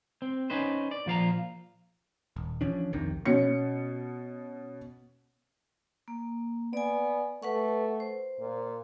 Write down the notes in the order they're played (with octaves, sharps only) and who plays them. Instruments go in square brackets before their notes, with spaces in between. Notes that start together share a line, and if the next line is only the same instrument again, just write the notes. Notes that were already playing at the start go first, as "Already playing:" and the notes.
[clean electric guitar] C4
C#4 D#4 B4 C5
D5
A#2 F3 F5 A#5
[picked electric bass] D#1
E3 F3 C#4 D4
C2 F2 C3 D#3
[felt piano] B2 C#4 C#7
[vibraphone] A#3
[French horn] B3 [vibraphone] D5 G#5
[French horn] A3 [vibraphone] B4 F#5 C#6
[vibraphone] C5
[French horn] A#2